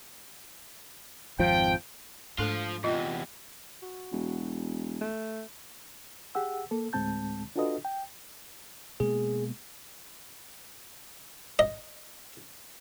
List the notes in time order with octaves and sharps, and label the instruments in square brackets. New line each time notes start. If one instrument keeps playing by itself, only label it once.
[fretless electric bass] G#1 F2 F3 [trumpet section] G5
[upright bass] G#2 [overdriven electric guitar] F3 F4 [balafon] A3 D4 A4
[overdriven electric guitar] E2 C3 [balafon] F4 D#5
[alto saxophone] F#4
[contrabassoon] E1
[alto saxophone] A3
[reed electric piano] G4 G#4 F#5 E6
A#3 A4
D2 A2 G#3 C4 A5 G6
D4 F4 F#4 A4 B4 D#5
G5
[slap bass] B2 G#3 A#3 [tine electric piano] G#4
[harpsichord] D#5